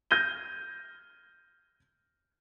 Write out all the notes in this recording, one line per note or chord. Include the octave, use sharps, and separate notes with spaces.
F6 G6 G#6 A#6 D#7 G7